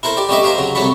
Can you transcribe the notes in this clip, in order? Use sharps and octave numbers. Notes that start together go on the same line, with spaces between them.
E4 A4 A#4 C5
G4 D5
G3 A3 C#4 G4 D#5 E5
A#4 C5 E5 F5 G#5
C#3 F#3
C2 F#3 A3 A4 C#5 B5